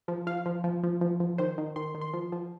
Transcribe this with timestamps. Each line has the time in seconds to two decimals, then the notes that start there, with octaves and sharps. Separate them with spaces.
0.08 F3
0.27 F3 F5
0.46 F3
0.64 F3
0.83 F3
1.01 F3
1.20 F3
1.38 D#3 C5
1.58 D#3
1.76 D#3 C6
1.95 D#3
2.01 C6
2.13 F3
2.32 F3